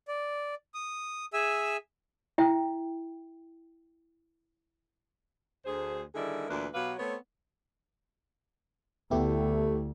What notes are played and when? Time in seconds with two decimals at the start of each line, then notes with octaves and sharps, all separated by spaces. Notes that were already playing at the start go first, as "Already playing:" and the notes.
0.08 D5
0.74 D#6
1.33 G#4 E5 G#5 E6
2.38 E4 E5 G5
5.66 D2 G#4 C5
6.15 D3 D#3 G3 E4 G#4 D#5
6.49 D2 A#2 E3 D4 A#4 B4
6.74 B2 F#3 G4 B4 F5 F#5
6.98 A3 B3 C4 C#5
9.11 D2 A3 B3 E4 G4